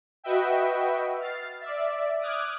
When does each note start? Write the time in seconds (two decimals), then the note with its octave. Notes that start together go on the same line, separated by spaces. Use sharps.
0.24 F#4 B4 D#5 E5 G5
1.19 F6 A6 C7
1.61 D5 E5
2.20 D6 D#6 F6 F#6 G#6